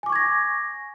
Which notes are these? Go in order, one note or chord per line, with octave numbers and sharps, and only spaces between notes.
G#5 C#6 D6 G#6 A#6